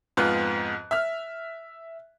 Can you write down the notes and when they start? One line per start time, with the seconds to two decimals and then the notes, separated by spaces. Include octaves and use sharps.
0.17 F2 G#2 B3 F4 F#6
0.91 E5 F6